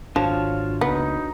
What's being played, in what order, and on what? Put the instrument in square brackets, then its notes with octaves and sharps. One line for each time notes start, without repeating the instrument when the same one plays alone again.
[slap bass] G#1 [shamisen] F3 [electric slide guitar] D4 F#4 C#5 [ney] F4
[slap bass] C#2 C#3 A#3 [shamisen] B3 [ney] D#4